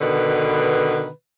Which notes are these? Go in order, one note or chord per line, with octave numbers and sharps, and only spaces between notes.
B2 D3 D#3 B4